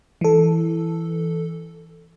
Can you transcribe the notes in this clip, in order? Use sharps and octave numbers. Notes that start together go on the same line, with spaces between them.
E3 A4